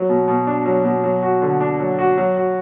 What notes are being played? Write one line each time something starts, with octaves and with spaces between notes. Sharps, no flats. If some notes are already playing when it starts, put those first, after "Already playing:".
Already playing: F#3
B2
B2
D4
F#3
B2
F#3
F#4
D3
D4
F#3
F#4
F#3
F#4